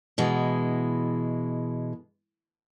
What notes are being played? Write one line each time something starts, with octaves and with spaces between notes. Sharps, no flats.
B2 E3 G#3